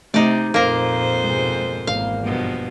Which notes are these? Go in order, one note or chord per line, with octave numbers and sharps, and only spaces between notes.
C3 A3 D#4 D5
F2 A#2 A#3 A#4 C5
G#2 B2 G#3
G#1 E2 A#3 F5
G2 B2 F3